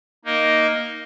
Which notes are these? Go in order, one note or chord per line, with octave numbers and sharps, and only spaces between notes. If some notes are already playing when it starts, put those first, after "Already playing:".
A#3 D#4 A#4 D#5